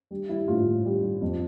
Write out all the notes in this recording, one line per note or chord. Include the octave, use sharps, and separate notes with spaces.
G3
G3 E4
A2 F4
A2
G3
G3
F2